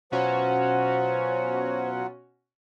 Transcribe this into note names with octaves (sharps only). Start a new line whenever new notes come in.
B2 F#3 C#4 F4 F#4 C5 F#5